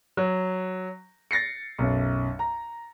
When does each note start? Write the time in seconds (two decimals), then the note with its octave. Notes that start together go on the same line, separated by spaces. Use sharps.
0.17 F#3
1.31 A6 A#6 C7 C#7
1.78 B1 F#2
2.39 A#5